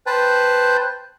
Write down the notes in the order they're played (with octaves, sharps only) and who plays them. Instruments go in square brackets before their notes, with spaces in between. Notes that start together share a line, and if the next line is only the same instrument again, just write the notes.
[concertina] B4 C5 G5 A5